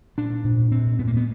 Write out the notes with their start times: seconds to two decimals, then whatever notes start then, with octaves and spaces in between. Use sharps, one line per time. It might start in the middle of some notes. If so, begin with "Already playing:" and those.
0.18 A#2 D4
0.44 A#2
0.71 A#2 C4
0.99 A#2 B3
1.07 A#3
1.17 B3